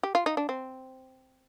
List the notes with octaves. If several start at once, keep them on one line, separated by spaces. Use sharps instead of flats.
G4
F4
D#4
D4
C4